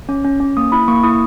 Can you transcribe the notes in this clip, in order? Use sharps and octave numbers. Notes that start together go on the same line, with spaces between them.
C#4
C#4
C#4
A#3 D#6
E4 B5
A#3 C#6
E4 D#6